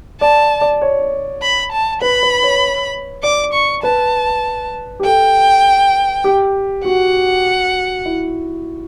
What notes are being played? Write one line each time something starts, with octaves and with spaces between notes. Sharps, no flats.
D5 A5
D5
C#5
B5
A5
B4 B5
B4
C#5
D5 D6
C#6
B4 A5
G4
A4 G5
G4
F#4 F#5
E4